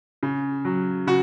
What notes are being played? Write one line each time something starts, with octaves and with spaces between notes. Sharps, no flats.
C#3
F#3
C#3 F#4